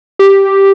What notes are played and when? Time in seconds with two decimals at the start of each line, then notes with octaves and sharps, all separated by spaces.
0.19 G4